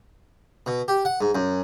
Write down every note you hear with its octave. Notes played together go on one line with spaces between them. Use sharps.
B2
G4
F#5
G#2
F#2